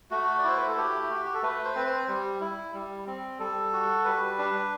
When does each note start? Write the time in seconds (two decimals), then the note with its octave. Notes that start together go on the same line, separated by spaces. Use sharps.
0.11 A3 F#4
0.38 D5
0.44 E4 C5
0.57 B4
0.68 A4
0.77 A3 G4
1.10 F#4
1.25 G4
1.34 A4
1.42 A3 B4
1.64 C5
1.75 C4 B4
1.87 C5
2.08 G3
2.41 E4
2.74 G3
3.07 C4
3.39 G3 A4
3.73 F#4
4.05 G3 B4
4.39 D4